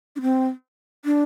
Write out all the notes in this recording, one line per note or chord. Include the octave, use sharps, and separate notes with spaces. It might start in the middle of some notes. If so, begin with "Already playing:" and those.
D4
C4
D4